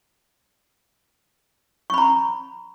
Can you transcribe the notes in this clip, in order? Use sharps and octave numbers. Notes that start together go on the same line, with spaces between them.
A#5 B5 C#6